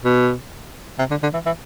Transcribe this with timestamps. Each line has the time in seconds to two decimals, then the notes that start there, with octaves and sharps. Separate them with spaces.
0.04 B2
0.99 C3
1.11 D3
1.23 D3
1.33 E3
1.46 E3